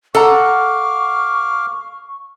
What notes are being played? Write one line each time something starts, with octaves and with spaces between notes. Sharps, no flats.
A4 F5 F#5 A#5 C#6 D6 F6